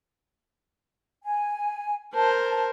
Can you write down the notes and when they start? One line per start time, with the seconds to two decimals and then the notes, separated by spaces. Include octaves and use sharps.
1.24 G#5
2.14 A#4 C5 A5